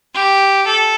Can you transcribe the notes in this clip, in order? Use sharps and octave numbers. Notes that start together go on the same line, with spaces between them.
G4
A4